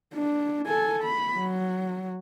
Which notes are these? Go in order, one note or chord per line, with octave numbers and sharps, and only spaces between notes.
D4
A4 G#5
B5
F#3